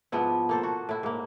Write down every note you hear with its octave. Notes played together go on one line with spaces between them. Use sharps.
G#2 F3 B3 E4
A#3 A4 C5
F#4
A2 E4
G#2 A#3